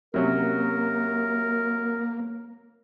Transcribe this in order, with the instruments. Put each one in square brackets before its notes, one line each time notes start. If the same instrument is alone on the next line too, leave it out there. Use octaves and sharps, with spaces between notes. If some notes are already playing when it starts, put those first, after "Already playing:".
[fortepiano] C3 F#3 C#4 [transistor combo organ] A#3 [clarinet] A#4